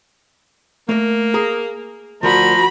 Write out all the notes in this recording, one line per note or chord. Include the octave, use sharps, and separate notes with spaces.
A3 A#3 A#4
G#4 A#5
D2 F3 F#4 A#4 F#5 A#5 B5